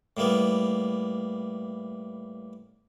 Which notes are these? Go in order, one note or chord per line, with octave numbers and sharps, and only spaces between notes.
A2 G3 A#3 B3